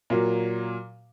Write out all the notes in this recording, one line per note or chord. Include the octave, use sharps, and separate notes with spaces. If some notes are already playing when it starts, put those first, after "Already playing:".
A#2 F#3 A#3